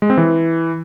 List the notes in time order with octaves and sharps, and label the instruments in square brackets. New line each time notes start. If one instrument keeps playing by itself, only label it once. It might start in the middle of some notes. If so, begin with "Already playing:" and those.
[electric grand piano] G#3
C4
E3